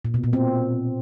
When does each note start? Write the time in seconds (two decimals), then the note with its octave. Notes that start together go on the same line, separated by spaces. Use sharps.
0.05 A#2
0.14 B2
0.24 A#2
0.33 C4